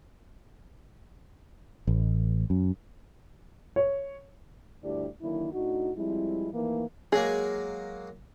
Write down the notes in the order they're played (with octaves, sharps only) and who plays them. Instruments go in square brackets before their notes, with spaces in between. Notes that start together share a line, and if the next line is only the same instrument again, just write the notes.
[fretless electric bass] A1
F#2
[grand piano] C#5
[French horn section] D2 G2 D4 E4 G4 D5
D3 D#3 F#3 A#3 D4 E4
A2 D4 D#4 F#4
F3 G3 G#3 C4 E4
D#2 D#3 E3 A3 A#3
[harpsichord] F#3 G#3 A#3 [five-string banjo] G#4